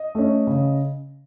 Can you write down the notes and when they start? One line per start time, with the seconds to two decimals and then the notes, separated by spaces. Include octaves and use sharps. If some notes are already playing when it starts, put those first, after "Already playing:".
Already playing: D#5
0.15 A3 C#4
0.47 C#3